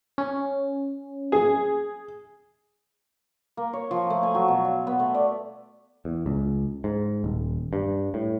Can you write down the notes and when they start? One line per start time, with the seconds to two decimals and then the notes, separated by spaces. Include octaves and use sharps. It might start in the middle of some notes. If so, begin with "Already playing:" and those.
0.18 C#4
1.32 G#4
3.57 A#3
3.73 C#5
3.91 F3
4.10 A3
4.23 G#5
4.35 F#3
4.48 B2
4.65 F5
4.87 B3
4.99 A3
5.14 D5
6.05 E2
6.26 C#2
6.84 G#2
7.24 D#1
7.73 G2
8.14 A2